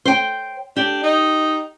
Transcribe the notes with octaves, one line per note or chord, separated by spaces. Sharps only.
C5 G5
D4 G4
D#4